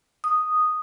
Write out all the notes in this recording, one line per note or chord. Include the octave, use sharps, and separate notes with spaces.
D#6